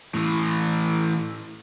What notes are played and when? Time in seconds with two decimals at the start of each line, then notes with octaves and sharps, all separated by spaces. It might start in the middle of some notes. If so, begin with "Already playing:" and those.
0.14 A2 E3